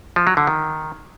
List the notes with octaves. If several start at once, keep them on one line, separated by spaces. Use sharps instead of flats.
F3
F#3
D3
D#3